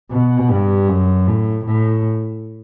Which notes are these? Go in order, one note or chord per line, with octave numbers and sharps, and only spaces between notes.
B2
G2
F#2
A2
A2